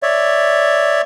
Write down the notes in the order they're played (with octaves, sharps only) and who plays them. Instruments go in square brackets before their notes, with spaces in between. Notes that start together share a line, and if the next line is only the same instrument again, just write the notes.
[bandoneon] C#5 D5 E5